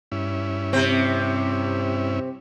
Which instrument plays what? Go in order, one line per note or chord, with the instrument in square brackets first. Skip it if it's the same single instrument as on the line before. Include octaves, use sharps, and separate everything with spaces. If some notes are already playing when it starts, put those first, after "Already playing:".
[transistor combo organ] G2 C#4 E4
[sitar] C3 C4